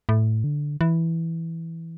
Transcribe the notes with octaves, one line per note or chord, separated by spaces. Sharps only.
A2
D3
E3